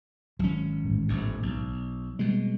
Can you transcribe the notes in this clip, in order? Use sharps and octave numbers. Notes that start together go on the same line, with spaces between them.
G#1 F#3 C#4
A1 G#2
F1 A#1 F2
B1
B2 G3 G#3 A#3